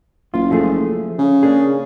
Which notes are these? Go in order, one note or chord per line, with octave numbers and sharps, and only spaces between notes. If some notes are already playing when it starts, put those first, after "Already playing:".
F#1 F4
F3 A3 G#4
C#3
A#3 D4 G#4